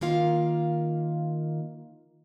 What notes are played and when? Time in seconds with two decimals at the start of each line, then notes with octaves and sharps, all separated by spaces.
0.01 D#3 A#3 F4 F5